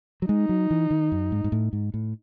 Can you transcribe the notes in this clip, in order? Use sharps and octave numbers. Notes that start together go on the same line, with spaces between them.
F#3
G#3 D#4
F#3
E3
D#3
F#2
G#2
G#2
A2
G#2
A2